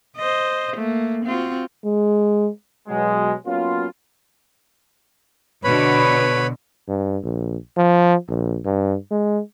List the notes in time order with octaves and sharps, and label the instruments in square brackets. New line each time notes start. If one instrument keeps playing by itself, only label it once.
[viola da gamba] C5 D#5
A3 A#3
C4 F4 F#4
[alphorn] G#3
[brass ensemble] B2 F#3 G#3
F#3 A#3 B3 C#4 F4
[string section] B2 D3 [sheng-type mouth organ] B4 C#5 B5
[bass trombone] G2
A#1
F3
A#1
G2
G#3